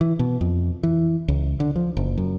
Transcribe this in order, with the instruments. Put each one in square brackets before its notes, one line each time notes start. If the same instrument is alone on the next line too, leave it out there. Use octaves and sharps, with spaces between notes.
[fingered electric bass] E3
B2
F2
E3
C#2
D3
F3
F#1
F#2